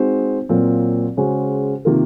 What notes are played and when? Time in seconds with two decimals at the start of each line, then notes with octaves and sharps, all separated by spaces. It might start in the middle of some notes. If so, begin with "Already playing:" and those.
Already playing: G#3 C4 D#4 F#4 C5
0.49 A#2 F#3 C4 F4 A#4
1.17 C#3 G#3 C#4 F#4 C5
1.85 C3 D#3 A#3 F4 A#4